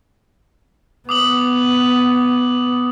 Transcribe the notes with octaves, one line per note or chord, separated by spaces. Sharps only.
B3 D6 D#6 F#7